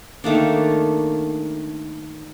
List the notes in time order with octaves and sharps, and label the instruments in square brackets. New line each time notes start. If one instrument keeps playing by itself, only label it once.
[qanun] D#3 A3 A#3 D4